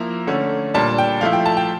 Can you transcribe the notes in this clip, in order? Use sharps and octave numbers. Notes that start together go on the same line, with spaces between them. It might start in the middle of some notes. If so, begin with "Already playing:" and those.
Already playing: F3 A#3 E4 A#5
D3 A3 C#4
A#2 G3 D4 A5
G5
F3 A3 E4 F5
G5
A5
G5